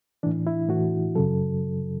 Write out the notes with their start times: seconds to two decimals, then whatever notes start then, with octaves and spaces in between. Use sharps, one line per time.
0.23 A2 E3 D4
0.47 E4
0.69 A2 E3 F#4
1.16 F#2 C#3 F#3 A4